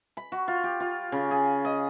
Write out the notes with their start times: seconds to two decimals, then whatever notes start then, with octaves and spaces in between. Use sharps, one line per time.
0.17 B5
0.32 F#4
0.48 F4
0.64 G4
0.80 F4
1.12 C#3
1.31 G#4
1.65 D#5